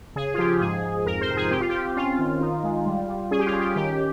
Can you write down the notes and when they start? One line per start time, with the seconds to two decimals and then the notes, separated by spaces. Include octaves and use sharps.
0.16 C#3 G#4
0.34 F4
0.38 F3 G4
0.61 G#2 G#4
0.84 G#2
1.06 F2 A#4
1.21 C5
1.29 C3
1.37 G#4
1.51 C4 G4
1.60 F4
1.70 C4 G4
1.97 C#4 F4
2.19 D#3
2.41 D#4
2.63 G#3
2.86 G3
3.08 G3
3.31 C#4 G#4
3.39 G4
3.46 F4
3.53 C#4
3.61 G4
3.76 D#3 G4